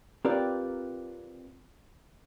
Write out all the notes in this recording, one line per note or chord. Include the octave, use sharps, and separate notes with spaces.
C4 F4 G4 A#4 B4 D5